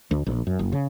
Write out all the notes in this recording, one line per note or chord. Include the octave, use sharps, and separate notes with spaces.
D2
A#1
F#2
F#1
C#3